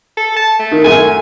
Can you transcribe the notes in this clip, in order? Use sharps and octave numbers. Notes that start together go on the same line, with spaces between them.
A4
A5
A3
D#3
F#2 A3 G#5